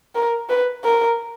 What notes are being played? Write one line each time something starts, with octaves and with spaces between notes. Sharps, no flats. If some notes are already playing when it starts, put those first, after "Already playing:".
A#4
B4
A#4